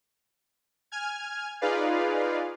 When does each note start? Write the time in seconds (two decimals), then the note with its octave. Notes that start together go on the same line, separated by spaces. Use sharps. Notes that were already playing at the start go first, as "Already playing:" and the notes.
0.92 G#5 F6 G#6
1.61 D#4 F4 G#4 B4 D5 F5